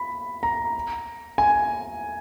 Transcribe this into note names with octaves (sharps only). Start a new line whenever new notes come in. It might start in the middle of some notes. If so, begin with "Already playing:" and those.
Already playing: B5
A#5
G#5